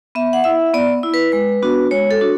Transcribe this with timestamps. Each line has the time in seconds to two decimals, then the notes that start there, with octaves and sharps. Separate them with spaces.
0.15 B3 E5
0.33 F#5
0.44 E4 E5
0.74 B3 D5
1.03 E4
1.14 B4
1.32 G#3 B4
1.62 B3 D4 F#4
1.91 G#3 C#5
2.11 A4
2.21 D4 F#4